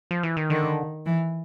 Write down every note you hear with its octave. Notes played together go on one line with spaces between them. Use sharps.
F3
E3
D#3
D3 D#3
E3